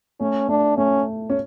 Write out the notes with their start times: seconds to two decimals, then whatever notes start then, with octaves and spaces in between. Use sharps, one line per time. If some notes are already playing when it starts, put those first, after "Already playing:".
0.20 A3 C#4
0.48 A3 D4
0.77 A3 C#4
1.30 C#4